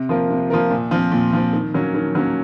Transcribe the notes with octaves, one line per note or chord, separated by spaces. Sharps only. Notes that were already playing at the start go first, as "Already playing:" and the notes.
Already playing: C3
F3 A#3 F4 A#4
C3
F3 A#3 F4 A#4
A#2
F3 C4
A#2
F3 C4
D#3
F#3 A#3 C#4
D#3
F#3 A#3 C#4